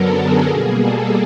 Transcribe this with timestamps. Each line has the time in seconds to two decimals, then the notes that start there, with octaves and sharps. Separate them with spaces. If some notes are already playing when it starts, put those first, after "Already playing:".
Already playing: F#2 D3 F#3 B3 A4 A#4
0.18 G#4
0.48 B2 G3 A#3 G#4
0.78 A4